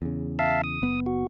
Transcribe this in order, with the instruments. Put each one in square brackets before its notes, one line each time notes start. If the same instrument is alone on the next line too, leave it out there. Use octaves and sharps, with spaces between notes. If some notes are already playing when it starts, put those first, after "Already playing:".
[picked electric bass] E2 C#3
[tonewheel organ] E5 F5 A5
D#6
[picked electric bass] F#1 B3
[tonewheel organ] F#4